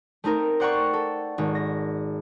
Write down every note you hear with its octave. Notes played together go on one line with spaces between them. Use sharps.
A3 C4 D#4 A#4
C5 D5 F#5 G5 A#5 C#6
A4
G#1
A#6